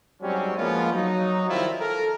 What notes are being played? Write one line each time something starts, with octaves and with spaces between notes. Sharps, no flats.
G#2 F#3 G3 C4 C#4
F3 G#3 A#3 B3 C#4 F4
F#3 D#4
D#3 F3 G3 C4 E4 F4
A4 A#4